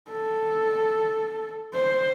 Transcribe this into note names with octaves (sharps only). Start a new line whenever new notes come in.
A4
C5